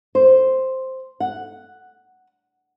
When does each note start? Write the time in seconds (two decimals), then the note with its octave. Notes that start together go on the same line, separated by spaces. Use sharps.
0.15 C5
1.20 F#5